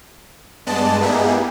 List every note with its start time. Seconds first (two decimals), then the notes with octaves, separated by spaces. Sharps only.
0.66 G2 G#3 B3 D5 D#5 A5
1.01 A#3 B3 D#4 E4 G4 G#4